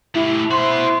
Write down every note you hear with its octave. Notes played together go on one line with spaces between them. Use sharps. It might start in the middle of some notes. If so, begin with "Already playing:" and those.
A3 E4 G4
F#4 C5 B5 C6